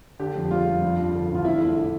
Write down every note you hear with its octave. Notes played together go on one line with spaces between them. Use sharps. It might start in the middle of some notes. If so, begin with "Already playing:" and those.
D3 G4
F2
G3 F4
F2
G2
F3
D3
A1 F4
E2 E4
A3
D3